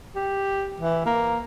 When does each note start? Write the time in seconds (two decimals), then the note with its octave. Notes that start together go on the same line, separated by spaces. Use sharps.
0.16 G4
0.80 E3
1.06 A#3